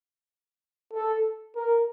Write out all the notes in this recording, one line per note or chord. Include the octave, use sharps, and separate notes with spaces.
A4
A#4